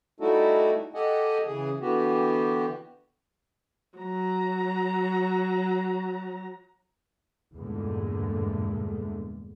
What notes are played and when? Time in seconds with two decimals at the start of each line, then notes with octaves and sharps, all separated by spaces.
0.20 G3 A3 D#4 E4 F#4 A4
0.94 G4 A4 D#5 F#5 G#5
1.46 C#3 E3 G#4
1.81 D3 E3 B3 F#4 G4
3.98 F#3 A#5
7.55 E2 G2 A#2 D3 G#3 A3